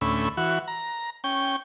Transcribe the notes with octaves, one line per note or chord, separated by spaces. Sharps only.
D2 A2 C#4 B5 E6
E3 F#4
A#5
C#4 G5